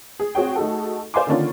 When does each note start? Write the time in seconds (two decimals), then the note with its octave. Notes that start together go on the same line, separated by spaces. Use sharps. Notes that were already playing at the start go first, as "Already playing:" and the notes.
0.20 G#4
0.35 C4 F#4 G#4 C#5 G5
0.56 A3 D#4 F#4 G#4 A4
1.14 C5 D5 F5 G#5 C6 D6
1.27 D3 D#3 A#3 C#4 D4 F4